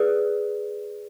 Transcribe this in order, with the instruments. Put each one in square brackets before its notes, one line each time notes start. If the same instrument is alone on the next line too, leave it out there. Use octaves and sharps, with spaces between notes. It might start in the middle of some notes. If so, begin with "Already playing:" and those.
Already playing: [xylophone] G#4 B4 D5